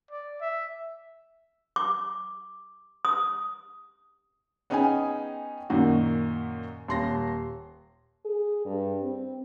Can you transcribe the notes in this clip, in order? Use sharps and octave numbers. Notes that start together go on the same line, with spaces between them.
D5
E5
D6
D#6
B3 C#4 D#4 G#4 G5 G#5
F#2 A#2 D#3 F#4
D#1 C6 A#6
G#4
G2
C4